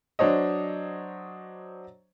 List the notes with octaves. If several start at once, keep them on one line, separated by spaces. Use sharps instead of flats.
F#3 D4 C5 C#5 D#5